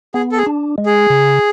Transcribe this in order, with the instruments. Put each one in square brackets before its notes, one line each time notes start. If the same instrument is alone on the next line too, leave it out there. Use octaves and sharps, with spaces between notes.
[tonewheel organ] B3 [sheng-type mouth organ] G#4
[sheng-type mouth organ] A4
G#4
[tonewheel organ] D4
G#3
[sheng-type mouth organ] G#4
[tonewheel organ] C#3